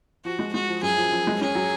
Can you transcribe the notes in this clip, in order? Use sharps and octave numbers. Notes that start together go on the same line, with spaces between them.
F3 F#4
G#3
G#3 F#4
F3
F#2 G#4
F3
F3
G#3
C#4 G#4
F#3